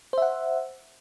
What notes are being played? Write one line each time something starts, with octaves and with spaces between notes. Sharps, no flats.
C5 E5 F#5